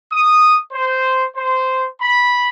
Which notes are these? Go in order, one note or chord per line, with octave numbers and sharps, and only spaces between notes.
D#6
C5
C5
B5